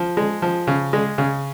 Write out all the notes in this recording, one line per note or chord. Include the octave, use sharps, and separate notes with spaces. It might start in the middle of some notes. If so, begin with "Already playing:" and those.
Already playing: F3
G#3
F3
C#3
G#3
C#3